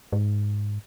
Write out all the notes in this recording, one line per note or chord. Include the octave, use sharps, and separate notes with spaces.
G#2